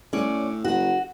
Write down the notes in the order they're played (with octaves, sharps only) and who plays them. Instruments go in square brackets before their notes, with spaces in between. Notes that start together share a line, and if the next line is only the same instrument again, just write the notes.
[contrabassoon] A2 [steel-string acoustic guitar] C#4 D5
[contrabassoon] F#1 [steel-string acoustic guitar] F#4